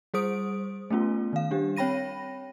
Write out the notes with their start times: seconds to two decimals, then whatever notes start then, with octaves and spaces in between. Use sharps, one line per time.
0.14 G3 G#4 C5 D#6 D7
0.90 A3 B3 C#4 F4
1.33 D#3 F5
1.51 G3 D4 G4
1.77 C4 C#5 G5 B5 A#6 D#7